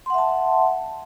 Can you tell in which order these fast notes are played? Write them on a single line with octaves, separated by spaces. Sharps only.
C6 F#5 E5 A5